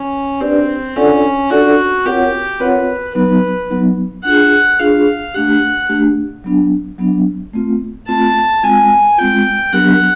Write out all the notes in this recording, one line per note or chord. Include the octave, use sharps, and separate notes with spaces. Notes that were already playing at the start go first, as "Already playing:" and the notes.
Already playing: C#4
C4 D4 G4 B4 D5
C#4 D4 F4 A4 D5 F#5
D4 F4 F#4 A4 D5 F#5
C4 F4 G4 A#4 C#5 F#5
C4 F4 A#4 B4 C#5 F#5
F#3 B3 D#4 B4
F#3 B3 D#4
D4 F4 G#4 F#5
D4 F4 G#4 F5
A3 D4 G4 F#5
A3 D4 G4
F#3 B3 D4
F#3 B3 D4
A3 C4 F4
A3 C4 F4 A5
G#3 C4 F4 G#5
G#3 C4 F4 G5
F#3 B3 D4 G4 A#4 F#5